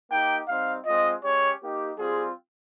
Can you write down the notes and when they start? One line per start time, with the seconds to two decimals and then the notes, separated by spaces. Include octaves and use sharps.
0.10 A#3 D#4 G4 G5
0.48 G3 C4 D#4 F5
0.85 G#3 C4 F4 D#5
1.23 G#3 C#4 G4 C#5
1.61 A#3 D#4 G4
1.98 G3 C4 F4 G#4